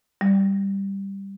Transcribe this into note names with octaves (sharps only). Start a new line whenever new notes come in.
G3